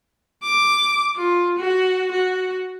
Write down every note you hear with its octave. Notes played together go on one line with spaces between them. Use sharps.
D6
F4
F#4
F#4